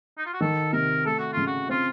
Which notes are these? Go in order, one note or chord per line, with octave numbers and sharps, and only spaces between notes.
D#4
F4
F#4
D#3 A4
C3 A#4
A3 A4
F#4
C#3 F4
F#4
C4 F4